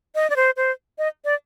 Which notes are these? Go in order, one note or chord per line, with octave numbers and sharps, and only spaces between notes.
D#5
D5
C5
C5
D#5
D5